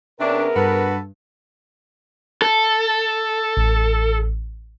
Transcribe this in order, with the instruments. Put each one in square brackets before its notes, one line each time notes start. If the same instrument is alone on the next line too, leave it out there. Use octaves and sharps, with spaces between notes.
[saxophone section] C3 C#4 D4 [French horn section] B3 G#4 A#4 [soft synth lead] E5
[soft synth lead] G2 [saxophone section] F#4 A4 B4
[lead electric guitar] A4
[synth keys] A1